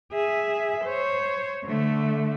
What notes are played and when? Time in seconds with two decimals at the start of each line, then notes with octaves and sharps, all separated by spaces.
0.12 G#4 E5
0.84 C5 C#5
1.64 D3 A3